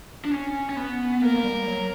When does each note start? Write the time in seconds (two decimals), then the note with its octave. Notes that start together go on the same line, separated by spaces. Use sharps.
0.25 D4
0.31 C#4
0.69 C#4
0.76 B3
1.22 A#3 A#4
1.36 A#3
1.44 G3
1.66 F#3